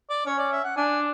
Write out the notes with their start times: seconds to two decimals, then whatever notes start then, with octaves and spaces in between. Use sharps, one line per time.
0.10 D5
0.26 C#4 C#5
0.39 D5
0.52 E5
0.64 F#5
0.77 D4 G#5